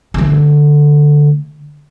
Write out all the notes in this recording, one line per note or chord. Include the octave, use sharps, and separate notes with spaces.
D3 A3